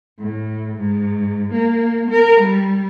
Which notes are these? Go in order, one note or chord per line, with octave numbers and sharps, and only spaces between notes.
A2
G#2
A#3
A#4
G3